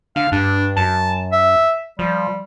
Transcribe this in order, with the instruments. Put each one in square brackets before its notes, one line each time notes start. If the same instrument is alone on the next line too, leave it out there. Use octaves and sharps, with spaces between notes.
[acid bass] D3 [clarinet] F5
[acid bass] G2 [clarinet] D4
[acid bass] F#2 [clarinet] A5
[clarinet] E5
[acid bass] F3 [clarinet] G3